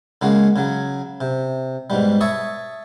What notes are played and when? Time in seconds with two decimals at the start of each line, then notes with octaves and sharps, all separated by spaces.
0.22 C#3 G#3 A#3 F#4
0.56 C#3 F#3
1.21 C3
1.90 G#2 B2 G3
2.21 C#5 E5 A5 C#6 D#6